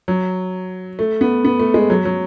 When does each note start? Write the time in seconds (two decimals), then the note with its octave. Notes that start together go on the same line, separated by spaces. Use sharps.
0.08 F#3
0.99 A3
1.21 B3
1.45 B3
1.59 A3
1.74 G#3
1.90 F#3
2.05 F#3